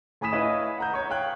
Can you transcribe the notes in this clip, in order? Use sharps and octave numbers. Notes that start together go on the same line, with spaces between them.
A2 G#5 B5 D#6 B6 E7
E4 B4 C#5 D#5 F5
F#5 A#5 G6
C#5 C#6
F5 G5 F#6